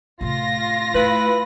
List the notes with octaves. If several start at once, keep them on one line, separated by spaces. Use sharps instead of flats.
A2 C3 F4 A#6
A3 E4 B4